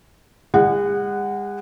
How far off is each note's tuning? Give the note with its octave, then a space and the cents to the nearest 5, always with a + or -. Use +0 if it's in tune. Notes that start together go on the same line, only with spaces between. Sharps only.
G#3 -40 F#5 +0